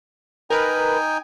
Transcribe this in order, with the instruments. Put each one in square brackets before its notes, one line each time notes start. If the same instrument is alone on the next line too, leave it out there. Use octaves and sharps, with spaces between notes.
[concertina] D#4 G5 G#5 [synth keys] A#4 B4